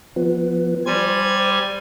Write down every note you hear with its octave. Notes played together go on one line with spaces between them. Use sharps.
F3 B3
G3 C5 G#5 G#6